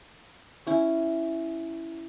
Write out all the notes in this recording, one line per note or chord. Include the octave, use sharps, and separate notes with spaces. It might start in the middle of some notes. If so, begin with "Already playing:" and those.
C#4 E4